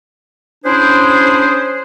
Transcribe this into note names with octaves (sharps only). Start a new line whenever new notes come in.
C#4 D4 E4 G#4 C5